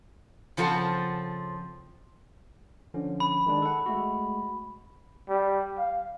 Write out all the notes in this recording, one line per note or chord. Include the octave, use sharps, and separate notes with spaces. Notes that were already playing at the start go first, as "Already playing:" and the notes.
C#3 F3 C4 A4 F#5
D3 F3 C#4
B5
D#3 G#3 D4
A4 F#5
G#3 A3 F#4
G3
F5